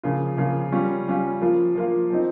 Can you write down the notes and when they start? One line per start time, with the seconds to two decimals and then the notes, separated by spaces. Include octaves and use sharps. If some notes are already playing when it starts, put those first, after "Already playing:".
0.03 C#3 F3 A#3 F4
0.37 C#3 F3 A#3 F4
0.72 G3 C#4 F4
1.07 G3 C#4 F4
1.41 F3 A#3 F4
1.75 F3 A#3 F4
2.10 F3 C4 D#4